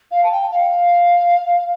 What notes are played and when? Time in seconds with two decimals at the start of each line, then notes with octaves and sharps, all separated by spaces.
0.11 F5
0.23 A5
0.31 G5
0.51 F5